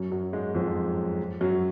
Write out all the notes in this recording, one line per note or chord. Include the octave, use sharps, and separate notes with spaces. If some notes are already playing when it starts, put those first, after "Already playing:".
Already playing: F#2 F#3
F#2 F#3
G#2 G#3
F2 F3
F#2 F#3